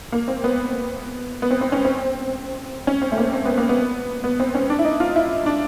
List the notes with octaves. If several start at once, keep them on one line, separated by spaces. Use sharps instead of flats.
A#3
C4
B3
B3
C4
C4
C#4
C4
C#4
C4
A3
A#3
C4
B3
A#3
B3
B3
C4
C#4
D4
E4
D#4
F4
E4
D4